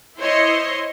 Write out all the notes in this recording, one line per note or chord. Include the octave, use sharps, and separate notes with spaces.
E4 C5 C#5 D#5 C6